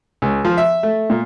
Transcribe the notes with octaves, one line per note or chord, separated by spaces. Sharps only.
C#2
F3
E5
A3
A#2